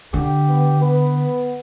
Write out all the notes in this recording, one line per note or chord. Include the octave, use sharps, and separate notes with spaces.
D3 G4
B3
B3 B4